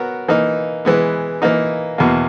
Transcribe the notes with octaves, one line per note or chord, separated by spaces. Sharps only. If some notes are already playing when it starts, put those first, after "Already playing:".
Already playing: F#3 B3 F#4 A#4
E3 A#3 D#4
E3 G#3 B3
E3 A#3 D#4
E2 B2 A#3